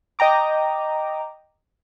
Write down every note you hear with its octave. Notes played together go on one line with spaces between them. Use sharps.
D#5 G5 A#5 D6